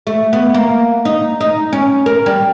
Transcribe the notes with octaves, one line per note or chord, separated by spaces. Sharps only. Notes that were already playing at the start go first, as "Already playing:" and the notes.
A3
B3
A#3
D#4
D#4
C#4
A#4
G3